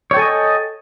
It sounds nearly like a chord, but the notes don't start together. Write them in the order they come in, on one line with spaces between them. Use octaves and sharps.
C#5 G5 A4 G#5 D#5